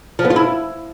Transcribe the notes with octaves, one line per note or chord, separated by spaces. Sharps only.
F3
B3
F4
E4